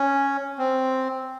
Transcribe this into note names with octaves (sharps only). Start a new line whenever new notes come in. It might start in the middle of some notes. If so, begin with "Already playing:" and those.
Already playing: C#4
C4